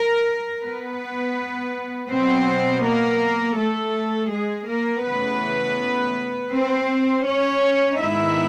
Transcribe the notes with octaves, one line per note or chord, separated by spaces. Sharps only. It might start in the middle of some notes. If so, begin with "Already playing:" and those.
Already playing: A#4
B3 B4
B2 F#3 B3 C4 C5
A#3 A#4
A3 A4
G#3 G#4
A#3 A#4
C#3 E3 A3 B3 B4
C4 C5
C#4 C#5
G#2 D#3 G#3 B3 D#4 E4 E5